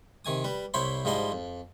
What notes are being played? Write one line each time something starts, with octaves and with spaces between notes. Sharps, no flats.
C3 D#3 G#5 D#6
G3 B4
C2 E4 C5 C#5 B5 C6
G#2 F3 G3 E4 D#5 C6
F2